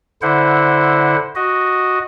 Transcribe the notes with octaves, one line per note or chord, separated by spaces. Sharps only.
D3 E4 C5 F#5
F#4 D#5